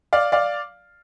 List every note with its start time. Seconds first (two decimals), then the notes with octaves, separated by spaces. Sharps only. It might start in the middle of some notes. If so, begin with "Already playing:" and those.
0.13 D5 F5
0.32 D5 F5